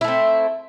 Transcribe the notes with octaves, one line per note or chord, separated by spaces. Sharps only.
A3 C4 E4